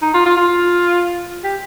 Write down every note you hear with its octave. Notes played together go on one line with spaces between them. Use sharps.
D#4
F4
F4
F4
G4